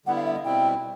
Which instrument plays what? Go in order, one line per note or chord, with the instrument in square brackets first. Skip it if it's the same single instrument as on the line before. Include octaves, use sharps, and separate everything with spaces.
[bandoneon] D3 G3 B3 E4 [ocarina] F#5
[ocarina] F5
E5
D#5
[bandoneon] B2 G3 C4 E4 [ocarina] G5